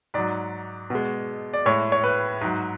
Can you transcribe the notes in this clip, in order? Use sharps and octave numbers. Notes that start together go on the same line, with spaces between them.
G#2 F#3 D5
B2 G#3
D5
A2 G#3 C#5
C#5
B4
G#2 F#3